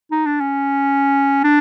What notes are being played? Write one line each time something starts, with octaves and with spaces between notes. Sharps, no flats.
D#4
D4
C#4
D4